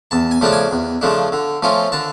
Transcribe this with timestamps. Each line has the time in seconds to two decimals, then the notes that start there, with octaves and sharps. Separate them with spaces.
0.11 E2 A5
0.31 G#5
0.41 C#3 F3 A3 D4 A5
0.52 G#5
0.71 E2
1.01 C#3 F3 A3 D4
1.32 D3
1.63 F3 A3 C#4 F4
1.92 D3 A5